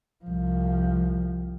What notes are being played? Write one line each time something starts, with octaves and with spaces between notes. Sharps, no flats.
C2 F3